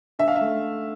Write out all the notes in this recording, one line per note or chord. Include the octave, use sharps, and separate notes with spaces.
D3 E5
F5
E5
A3